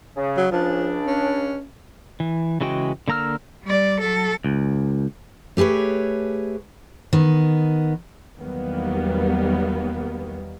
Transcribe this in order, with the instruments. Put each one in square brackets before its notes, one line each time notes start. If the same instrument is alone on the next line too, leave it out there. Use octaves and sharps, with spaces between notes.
[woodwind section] C#3
[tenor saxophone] F#3
[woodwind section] C#2 C#3 D4 [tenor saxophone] F3
[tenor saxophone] C#4
[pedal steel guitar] E3
C#3 E3 G#3 F#4 G5
D3 A#3 A#5 E6 F6
[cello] G3 D5
F#3 A4
[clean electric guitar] C#2
[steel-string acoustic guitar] A3 G4 G#4 B4 C#5
D#3 B3
[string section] E2 D#3 F#3 G3 A#3 B3